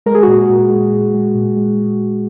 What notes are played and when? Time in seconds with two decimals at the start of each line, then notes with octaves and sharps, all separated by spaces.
0.06 G#3 A#4
0.15 G#4
0.23 F#4
0.27 A#2 G#4
0.49 A#2
0.70 G#3
0.92 A#2
1.14 G#3
1.35 A#2
1.56 G#3